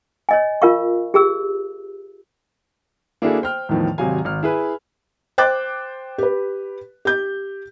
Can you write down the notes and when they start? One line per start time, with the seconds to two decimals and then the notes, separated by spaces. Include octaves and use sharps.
0.29 C#5 D#5 G#5
0.62 F4 A#4 F5 C#6
1.14 G4 G#4 E6
3.22 A#3 D4 E4 F#4 G#4 A4
3.42 C5 G5 F6
3.69 E2 A2 D#3 F3
3.98 G#1 C3 F#3 F5 G#5
4.25 G#1 F6
4.43 E4 G#4 B4
5.38 C5 G5 D6 F#6 A6
6.18 G4 B4
7.05 G4 G6